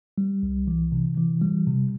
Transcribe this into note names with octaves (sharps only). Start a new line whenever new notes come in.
G3
C2
E3
C3
E3
G3
C3